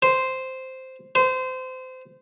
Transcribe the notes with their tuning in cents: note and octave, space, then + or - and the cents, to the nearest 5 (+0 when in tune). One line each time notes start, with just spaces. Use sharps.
C5 -5
C5 -25